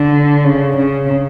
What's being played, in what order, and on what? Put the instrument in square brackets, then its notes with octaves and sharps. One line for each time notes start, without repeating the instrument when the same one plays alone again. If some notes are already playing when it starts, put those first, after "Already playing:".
Already playing: [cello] D3
C#3
C#3